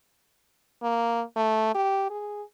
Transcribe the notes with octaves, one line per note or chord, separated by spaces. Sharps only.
A#3
A3
G4
G#4